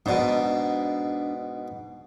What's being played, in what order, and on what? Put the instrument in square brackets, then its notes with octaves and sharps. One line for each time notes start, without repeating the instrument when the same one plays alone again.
[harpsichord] G#2 B2 [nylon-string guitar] D4 D5 D#5